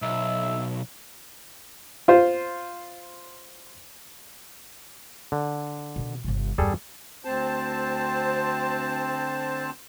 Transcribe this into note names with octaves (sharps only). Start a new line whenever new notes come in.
B1 E5
F4 C5
D3
B2 D#3
G1 C3
E2 G2 G3 G#4 A4
D2 C4 C5 A5